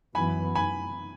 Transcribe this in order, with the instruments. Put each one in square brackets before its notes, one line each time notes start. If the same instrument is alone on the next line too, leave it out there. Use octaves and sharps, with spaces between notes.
[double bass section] F#2 E3 B3 [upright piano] G#5 B5
[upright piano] G#5 B5